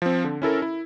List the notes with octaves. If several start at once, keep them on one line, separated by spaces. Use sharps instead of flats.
F3 C4
D3
C#4 E4 A4 A#4
E4